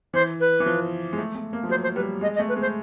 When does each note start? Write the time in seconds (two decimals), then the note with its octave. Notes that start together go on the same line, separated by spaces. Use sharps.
0.14 E3 C5
0.40 B4
0.60 E3
0.66 F3
1.13 G#3
1.18 A3
1.35 A3
1.53 A#3
1.63 F3
1.69 F#3 C5
1.83 C5
1.95 G3 B4
2.21 G#3 D#5
2.35 D#5
2.39 A3
2.48 B4
2.57 G#3 C5